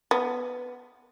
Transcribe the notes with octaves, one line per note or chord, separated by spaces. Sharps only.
B3